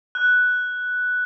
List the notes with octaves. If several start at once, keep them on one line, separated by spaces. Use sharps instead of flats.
F#6